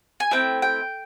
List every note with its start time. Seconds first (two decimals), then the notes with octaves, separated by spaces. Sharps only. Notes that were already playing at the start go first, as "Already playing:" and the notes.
0.20 G#5
0.31 A3 C4 E4 G5
0.62 G5